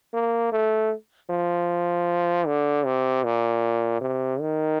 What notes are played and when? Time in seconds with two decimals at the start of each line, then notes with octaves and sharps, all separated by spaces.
0.14 A#3
0.52 A3
1.30 F3
2.47 D3
2.85 C3
3.24 A#2
4.01 C3
4.40 D#3